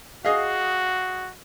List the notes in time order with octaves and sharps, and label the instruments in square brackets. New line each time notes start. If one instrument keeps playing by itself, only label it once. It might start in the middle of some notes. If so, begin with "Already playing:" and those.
[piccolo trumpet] F#4 [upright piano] G#4 D#5 F5